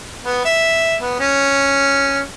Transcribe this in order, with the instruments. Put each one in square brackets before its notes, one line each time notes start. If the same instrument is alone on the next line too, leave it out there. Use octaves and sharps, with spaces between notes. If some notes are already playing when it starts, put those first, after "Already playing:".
[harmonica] B3
E5
B3
C#4